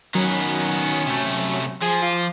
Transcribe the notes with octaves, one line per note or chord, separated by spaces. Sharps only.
D#3 F#3 B3 C#4
C3 A3
F3 G#4
F4 D6